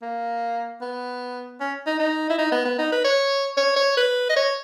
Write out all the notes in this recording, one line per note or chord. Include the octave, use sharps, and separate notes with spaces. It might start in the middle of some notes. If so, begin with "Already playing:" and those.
A#3
B3
C#4
D#4
D#4
E4
D#4
B3
B3
D#4
B4
C#5
C#5
C#5
B4
D#5
C#5